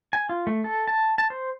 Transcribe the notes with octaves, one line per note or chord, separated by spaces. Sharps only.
G#5
F4
A3
A4
A5
A5
C5